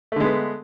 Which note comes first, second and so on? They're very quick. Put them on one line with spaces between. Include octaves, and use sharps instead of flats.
A3 D3 G#3 B3